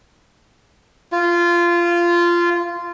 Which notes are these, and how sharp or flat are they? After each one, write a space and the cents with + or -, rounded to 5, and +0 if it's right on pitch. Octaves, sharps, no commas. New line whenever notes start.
F4 -15